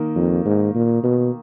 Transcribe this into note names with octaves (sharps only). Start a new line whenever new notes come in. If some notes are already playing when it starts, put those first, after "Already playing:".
Already playing: D#3 A#3
F2
G#2
A#2
B2